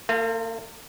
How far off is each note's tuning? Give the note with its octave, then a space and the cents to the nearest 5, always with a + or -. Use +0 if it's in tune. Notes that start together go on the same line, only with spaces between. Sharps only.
A#3 -45 F4 +5 A4 -5